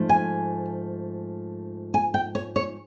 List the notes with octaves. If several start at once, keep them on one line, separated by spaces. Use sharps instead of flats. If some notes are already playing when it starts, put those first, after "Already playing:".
Already playing: G#2 F3 A3
G#5
G#5
G5
C#5
C#5